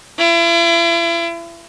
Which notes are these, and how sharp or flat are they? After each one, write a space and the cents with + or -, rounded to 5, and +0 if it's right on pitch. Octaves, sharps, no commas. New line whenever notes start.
E4 +40